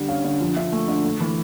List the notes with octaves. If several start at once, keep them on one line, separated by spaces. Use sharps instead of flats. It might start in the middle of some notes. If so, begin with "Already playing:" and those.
Already playing: D3 G3
C#4 F5
D3
F3
D3 E5
A3
D3
A3
E3